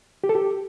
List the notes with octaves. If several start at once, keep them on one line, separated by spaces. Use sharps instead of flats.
G4
A4
G4